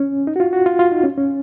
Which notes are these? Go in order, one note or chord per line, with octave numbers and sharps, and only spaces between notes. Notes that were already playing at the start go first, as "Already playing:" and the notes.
Already playing: C#4
D#4
F#4
F4
F#4
F4
F4
D#4
C#4
C#4